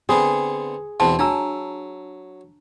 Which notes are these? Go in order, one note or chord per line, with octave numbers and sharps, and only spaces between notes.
D3 B3 C4 G#4
E2 B2 C4 A5
F#3 D4 A#5 E6